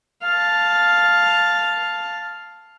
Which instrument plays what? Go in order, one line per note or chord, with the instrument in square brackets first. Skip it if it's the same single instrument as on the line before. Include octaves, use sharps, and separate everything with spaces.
[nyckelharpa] F5 A5